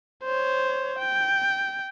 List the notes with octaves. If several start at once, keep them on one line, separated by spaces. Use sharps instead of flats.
C5 C#5
G5